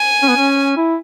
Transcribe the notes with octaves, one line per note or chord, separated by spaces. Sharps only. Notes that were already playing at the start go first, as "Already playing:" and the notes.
Already playing: G#5
C#4
B3
C#4
E4